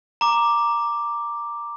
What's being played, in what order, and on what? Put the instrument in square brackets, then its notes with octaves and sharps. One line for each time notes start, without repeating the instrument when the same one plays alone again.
[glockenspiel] A#5 D6